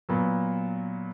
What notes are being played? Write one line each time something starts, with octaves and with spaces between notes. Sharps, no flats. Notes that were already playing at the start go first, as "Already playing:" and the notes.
A#2 F#3 B3